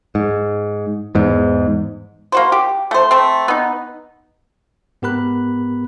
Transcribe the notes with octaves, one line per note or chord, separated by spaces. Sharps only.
G#2
E2 G#2
A#3 F#4 C5
G4
A3 C5
A3 C4
B3 D#4
G#2 B3 G4 A#4 B5 F#6